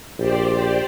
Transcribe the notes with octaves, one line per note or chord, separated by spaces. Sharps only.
A#1 G4 C5 D5